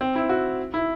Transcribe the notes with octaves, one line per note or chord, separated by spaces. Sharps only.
C4
E4
F#4
E4